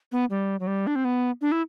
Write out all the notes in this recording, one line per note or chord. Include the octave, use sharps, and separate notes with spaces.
B3
G3
F#3
G3
D4
C4
B3
D4
E4